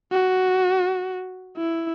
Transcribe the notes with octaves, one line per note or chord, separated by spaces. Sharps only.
F#4
E4